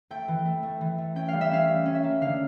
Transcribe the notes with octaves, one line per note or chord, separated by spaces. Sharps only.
A3 G5
E3
A3
A3
E3
A3
C#4 G5
G3 F5
E5
C#4 F5
G3
C#4
E5
A#3
D3 F5